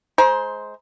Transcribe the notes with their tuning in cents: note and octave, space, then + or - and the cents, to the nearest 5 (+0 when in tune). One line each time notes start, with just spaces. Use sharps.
G#3 +25 C5 +0 A#5 +30